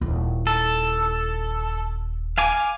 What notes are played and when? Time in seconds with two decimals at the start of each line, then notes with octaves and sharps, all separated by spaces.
0.01 D#1 E4
0.47 A4
2.38 F5 G#5 D6